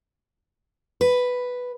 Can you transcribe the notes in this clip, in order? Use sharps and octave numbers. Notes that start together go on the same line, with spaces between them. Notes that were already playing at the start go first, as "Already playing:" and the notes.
B4